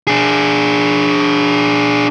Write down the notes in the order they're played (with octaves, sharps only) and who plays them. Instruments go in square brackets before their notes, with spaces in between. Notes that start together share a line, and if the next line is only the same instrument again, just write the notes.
[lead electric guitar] D4 G#4